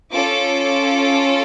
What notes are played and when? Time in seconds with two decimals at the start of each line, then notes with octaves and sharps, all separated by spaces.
0.13 C#4 F4 A4 D6